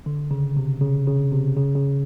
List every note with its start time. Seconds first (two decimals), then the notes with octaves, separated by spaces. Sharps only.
0.06 D3
0.31 C#3
0.57 C3
0.82 C#3
1.07 C#3
1.32 C3
1.57 C#3
1.75 C#3